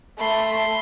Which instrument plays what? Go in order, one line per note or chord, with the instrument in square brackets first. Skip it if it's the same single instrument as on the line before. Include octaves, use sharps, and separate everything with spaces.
[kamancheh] A3 [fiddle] B5 C6